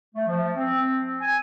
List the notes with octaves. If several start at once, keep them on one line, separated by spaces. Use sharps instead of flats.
A3
F3
C4
G#5